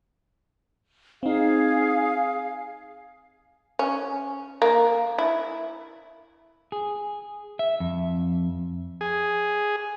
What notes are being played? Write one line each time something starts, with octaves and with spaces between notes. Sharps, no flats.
C4 D#4 G#4 F5
C#4
A#3
E4
G#4
E5
F2
G#4